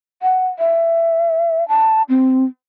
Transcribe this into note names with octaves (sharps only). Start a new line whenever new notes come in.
F#5
E5
A5
C4